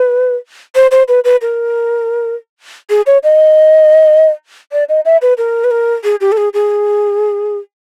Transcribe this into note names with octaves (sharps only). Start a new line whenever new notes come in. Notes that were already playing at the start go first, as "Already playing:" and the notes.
Already playing: B4
C5
C5
B4
B4
A#4
G#4
C#5
D#5
D5
D#5
E5
B4
A#4
B4
A#4
G#4
G4
A4
G#4
G#4